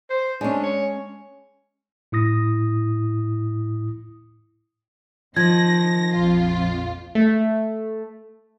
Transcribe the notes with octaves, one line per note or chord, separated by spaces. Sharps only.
C5
G#3 C#4 D4
C#5
A2 E4 D#6 A#6
D#3 F3 G#6 A#6
A#1 F2 F4
A3